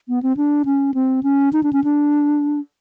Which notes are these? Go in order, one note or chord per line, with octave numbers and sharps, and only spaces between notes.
B3
C4
D4
C#4
C4
C#4
D#4
D4
C#4
D4